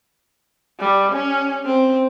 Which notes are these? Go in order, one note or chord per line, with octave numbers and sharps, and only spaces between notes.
G3
C#4
C4